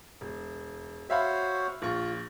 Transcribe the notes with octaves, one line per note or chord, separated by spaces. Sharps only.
E1
F#4 C5 C#5 E5 F5 B5
A#1 F4 C#6